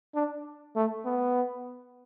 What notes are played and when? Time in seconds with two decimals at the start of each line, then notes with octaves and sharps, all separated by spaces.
0.15 D4
0.76 A3
1.05 B3